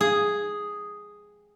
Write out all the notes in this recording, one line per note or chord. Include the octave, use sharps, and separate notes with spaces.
G#4